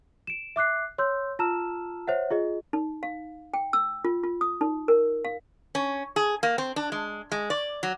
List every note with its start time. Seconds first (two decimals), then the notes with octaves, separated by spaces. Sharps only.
0.27 D7 E7
0.56 E5 D6 F#6 C7
0.98 C#5 C6 E6 G6
1.39 F4 A5 A#5 E6 F6 E7
2.07 C5 C#5 E5 F#5
2.30 F4 G#4 D#5
2.73 D#4
3.03 F5
3.54 G5
3.73 E6
4.05 F4
4.23 F4
4.41 D#6
4.61 D#4
4.88 A#4
5.25 F5
5.75 C#4
6.16 G#4
6.43 A#3
6.58 C4
6.76 D4
6.92 G#3
7.32 G#3
7.50 D5
7.83 F#3